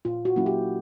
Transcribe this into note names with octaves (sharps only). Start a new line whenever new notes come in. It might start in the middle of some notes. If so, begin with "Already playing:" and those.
A#2 F4
F#4
F#3 A#3 C#4 E4
G4